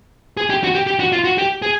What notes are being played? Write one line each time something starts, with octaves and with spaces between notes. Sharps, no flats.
G#4
G4
F#4
G4
G4
F#4
F4
F#4
G4
G#4